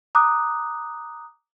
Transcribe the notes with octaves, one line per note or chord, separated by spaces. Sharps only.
A#5 D6 D#6 F#6